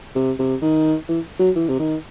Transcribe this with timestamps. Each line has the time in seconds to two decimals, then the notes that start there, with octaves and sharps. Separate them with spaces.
0.16 C3
0.39 C3
0.62 D#3
1.09 E3
1.40 F#3
1.56 E3
1.69 C3
1.79 D#3